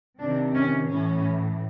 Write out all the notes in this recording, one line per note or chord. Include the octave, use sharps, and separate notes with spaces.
C3 D#3 D4
C#4
A2 E3 C#4